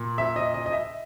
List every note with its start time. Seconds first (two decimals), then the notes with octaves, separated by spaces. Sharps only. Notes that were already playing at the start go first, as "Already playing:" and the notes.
Already playing: A#2
0.18 E5
0.36 D#5
0.54 D#5
0.66 D#5
0.73 E5